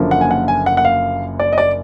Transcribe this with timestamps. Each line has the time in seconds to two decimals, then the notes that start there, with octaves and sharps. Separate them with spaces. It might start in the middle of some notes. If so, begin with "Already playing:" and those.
Already playing: F#1 F#2 D3 F3 A#3
0.11 F#5
0.21 G#5
0.31 F#5
0.48 G#5
0.66 F#5
0.77 F#5
0.85 F5
1.40 D5
1.53 D#5
1.58 D5